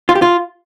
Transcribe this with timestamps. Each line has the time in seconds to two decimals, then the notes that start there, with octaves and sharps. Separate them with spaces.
0.09 F4
0.15 G4
0.22 F4